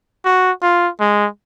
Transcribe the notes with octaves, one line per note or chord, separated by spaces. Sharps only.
F#4
F4
G#3